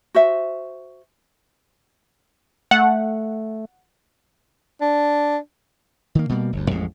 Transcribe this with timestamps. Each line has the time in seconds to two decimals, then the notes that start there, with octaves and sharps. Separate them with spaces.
0.15 F#4 C5 E5
2.71 A3 F#5
4.81 D4
6.15 D#3 A#3
6.29 B2 G3 A#3
6.53 G1 D2
6.70 A1 F2 A2 G#3